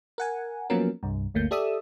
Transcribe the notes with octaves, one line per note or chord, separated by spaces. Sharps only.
A#4 F#5 G#5
F3 F#3 A#3 B3 C#4 A#4
C2 G2
G1 D2 A3 A#3 G6
G4 A4 D5 E5 D#6 E6